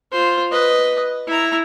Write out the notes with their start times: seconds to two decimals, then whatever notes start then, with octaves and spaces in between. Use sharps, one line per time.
0.12 F4 C5
0.52 B4 D#5
1.27 E4 A#5